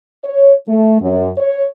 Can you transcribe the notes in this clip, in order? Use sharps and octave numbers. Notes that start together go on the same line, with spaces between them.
C#5
A3
F#2
C#5